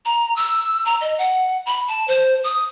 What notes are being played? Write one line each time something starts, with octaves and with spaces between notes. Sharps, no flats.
A#5
E6
A#5
D#5
F#5
B5
A5
C5
D#6